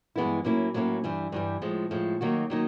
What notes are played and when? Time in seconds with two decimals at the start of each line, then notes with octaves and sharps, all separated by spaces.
0.16 G2 E3 G#3 B3 E4
0.44 A2 F#3 A#3 C#4 E4
0.74 A2 F#3 A#3 C#4 E4
1.04 G2 E3 G3
1.32 G2 E3 G3
1.62 A2 F3 G#3
1.91 A2 F3 G#3
2.21 D#3 F#3 A#3 D#4 F#4
2.50 D#3 F#3 A#3 D#4